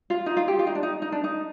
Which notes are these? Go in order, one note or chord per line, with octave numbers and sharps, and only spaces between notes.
F4
D#4
F4
G4
F4
D#4
D4
D#4
D#4
D4
D#4